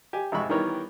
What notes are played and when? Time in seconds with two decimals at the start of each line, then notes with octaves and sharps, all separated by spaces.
0.13 G4 G#5
0.32 G#1 F2 C3 G#3 B5 C#6
0.49 D#3 E3 G3 B3 A#4 C#5